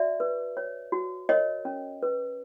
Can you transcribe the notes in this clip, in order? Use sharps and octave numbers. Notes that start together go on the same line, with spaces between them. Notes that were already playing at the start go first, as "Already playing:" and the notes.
Already playing: F#4 D5 E5
B4
C#5
F#4
A#4 C#5 D#5
C#4
B4